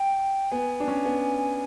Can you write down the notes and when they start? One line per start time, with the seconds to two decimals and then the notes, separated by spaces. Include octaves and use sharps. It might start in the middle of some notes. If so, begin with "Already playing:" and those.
Already playing: G5
0.51 B3 G#5
0.80 D4
0.88 C#4
1.05 B3